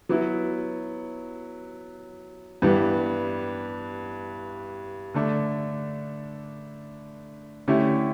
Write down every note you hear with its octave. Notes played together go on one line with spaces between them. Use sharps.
F#3 B3 E4
G2 E3 G3 B3
D3 A3 D4
D3 A3 C#4 E4 G4